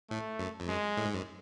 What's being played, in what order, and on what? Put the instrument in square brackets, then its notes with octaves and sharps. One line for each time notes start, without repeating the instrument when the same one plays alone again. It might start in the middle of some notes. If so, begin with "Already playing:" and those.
[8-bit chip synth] A2 [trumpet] A3
[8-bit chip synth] F#2
F2
[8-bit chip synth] F#2 [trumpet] G#3
[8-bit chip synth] A2
G#2
F#2